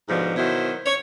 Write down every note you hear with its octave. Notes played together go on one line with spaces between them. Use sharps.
G#2 B2 D3 F3
B2 D#3 F#3 E4 C5
C#5